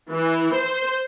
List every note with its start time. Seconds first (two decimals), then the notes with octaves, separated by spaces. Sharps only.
0.11 E3
0.54 C5